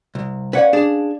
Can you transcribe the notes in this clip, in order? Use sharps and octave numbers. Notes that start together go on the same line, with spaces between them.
C2
C#4 B4 C#5 D5 F5 F#5
D4 G#4 A5